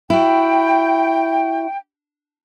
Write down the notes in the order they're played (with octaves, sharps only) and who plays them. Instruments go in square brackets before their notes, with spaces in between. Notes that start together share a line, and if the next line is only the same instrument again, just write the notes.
[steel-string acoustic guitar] E4 F#4 [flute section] G5